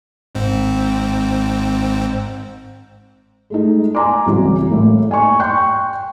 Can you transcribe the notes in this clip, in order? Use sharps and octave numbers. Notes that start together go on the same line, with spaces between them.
G#1 G#2 C4
G#3 A3 D#4
G#5 A#5 C6 D6
C2 C#3 E3 F#3
A2 A#3
G#5 C#6
G5 C6 C#6 F#6 G6